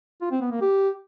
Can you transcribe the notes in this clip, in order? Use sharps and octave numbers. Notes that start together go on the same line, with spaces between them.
F4
C4
B3
A#3
G4